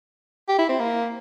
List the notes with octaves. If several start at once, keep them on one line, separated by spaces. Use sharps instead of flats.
G4
E4
C4
A#3